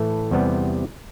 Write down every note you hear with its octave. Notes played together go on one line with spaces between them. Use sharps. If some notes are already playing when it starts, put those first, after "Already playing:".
Already playing: A2 E3 A3 A5
E2 C3 G3 B3